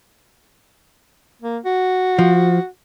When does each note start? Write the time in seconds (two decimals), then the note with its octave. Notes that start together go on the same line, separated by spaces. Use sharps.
1.42 A#3
1.65 F#4
2.19 F3